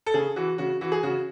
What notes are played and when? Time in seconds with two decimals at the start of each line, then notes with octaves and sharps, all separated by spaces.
0.06 A4
0.14 C#3 G#4
0.36 E3 F#4
0.58 C#3 F#4
0.81 E3 F#4
0.92 G#4
1.03 C#3 F#4